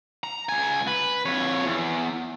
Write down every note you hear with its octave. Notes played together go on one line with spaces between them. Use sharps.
A#5
C#2 G#5
B4
F2 C#5
E2